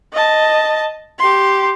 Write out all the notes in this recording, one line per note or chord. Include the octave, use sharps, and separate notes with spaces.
D#5 A5
G4 C6